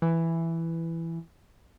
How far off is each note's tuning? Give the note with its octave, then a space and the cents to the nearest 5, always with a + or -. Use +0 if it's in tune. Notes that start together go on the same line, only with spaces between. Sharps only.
E3 +5